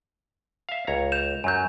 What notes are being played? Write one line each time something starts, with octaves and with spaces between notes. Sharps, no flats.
E5 F5
C#2 C#5 A#5
G6 E7 F7
F#2 F#3 G#5 G6